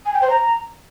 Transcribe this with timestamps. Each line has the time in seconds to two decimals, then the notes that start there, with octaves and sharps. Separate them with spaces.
0.06 G#5
0.14 G5
0.22 C5
0.30 A#5